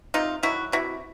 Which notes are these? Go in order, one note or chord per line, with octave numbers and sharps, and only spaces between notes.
C3 D#4 F4
D#3 F#3 E4 F#4
C3 E4 F#4